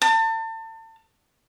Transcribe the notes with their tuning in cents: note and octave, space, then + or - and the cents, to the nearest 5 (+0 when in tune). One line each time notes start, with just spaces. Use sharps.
A5 +35